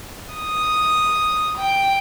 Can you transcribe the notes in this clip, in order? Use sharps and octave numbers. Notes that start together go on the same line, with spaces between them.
D#6
G5